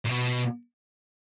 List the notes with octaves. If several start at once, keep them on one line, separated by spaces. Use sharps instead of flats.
A#2
B2